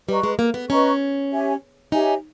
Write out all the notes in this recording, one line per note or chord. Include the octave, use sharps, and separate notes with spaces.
G3 B4 D#5 A#5 C#6
G#3
A#3
B3
C#4 B4 D#5 A#5 C#6
G4 C#5 E5 G#5
D#4 G4 C#5 E5 G#5